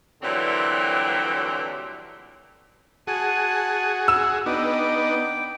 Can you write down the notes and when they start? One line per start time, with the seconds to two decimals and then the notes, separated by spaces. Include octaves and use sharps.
0.23 A#2 D3 E3 F#3 G3 C4
3.07 F#4 G#4 G#5 A5
4.08 E6 E7
4.46 B3 D4 D#4 G5 D6